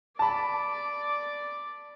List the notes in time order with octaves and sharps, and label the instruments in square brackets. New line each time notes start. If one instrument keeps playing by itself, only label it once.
[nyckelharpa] D5 [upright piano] A5 B5